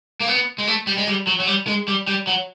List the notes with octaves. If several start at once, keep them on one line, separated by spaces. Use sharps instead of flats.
A#3
B3
G#3
A3
G3
G#3
G3
F#3
F#3
G3
G#3
G3
G3
F#3